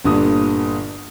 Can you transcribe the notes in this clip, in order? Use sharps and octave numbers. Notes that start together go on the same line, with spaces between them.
G1 G2 A#2 D3 D#6